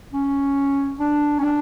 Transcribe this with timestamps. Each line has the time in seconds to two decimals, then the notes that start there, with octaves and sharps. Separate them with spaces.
0.13 C#4
0.99 D4
1.39 C#4
1.43 D4